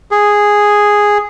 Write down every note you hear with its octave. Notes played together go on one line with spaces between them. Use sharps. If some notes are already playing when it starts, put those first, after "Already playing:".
G#4